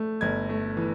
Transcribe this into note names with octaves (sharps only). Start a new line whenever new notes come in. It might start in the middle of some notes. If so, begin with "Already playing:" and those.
Already playing: A3
G1 G#6
A3
E3